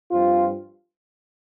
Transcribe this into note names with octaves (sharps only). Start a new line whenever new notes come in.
G2 F3 C4 F4